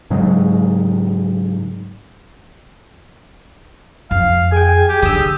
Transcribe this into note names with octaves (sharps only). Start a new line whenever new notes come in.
G#2 C#3 F#3 G#3
F2 F5
G#4 G5 G#5
G4
D3 G4 D#6 E6